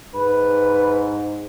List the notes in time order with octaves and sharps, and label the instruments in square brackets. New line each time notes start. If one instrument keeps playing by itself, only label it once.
[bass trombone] G#2 [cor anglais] B4